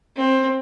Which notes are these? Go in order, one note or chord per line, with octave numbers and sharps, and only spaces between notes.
C4